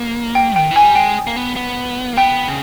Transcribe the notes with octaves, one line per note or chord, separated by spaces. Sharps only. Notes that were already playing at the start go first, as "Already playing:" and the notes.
Already playing: A#3
G5
D#3 G5
E3
G#5
G3
G#3 G5
A#3
B3
B3
A#3
B3 G5
C#3